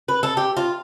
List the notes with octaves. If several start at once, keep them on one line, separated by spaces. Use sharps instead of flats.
B4
A4
G4
F4